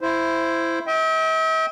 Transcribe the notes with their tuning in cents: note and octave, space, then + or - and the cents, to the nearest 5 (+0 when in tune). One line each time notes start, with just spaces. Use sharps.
E4 +10 C5 +0
E5 -45 G5 +0